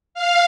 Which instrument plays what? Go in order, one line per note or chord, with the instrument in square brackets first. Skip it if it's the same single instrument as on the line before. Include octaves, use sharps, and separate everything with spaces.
[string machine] F5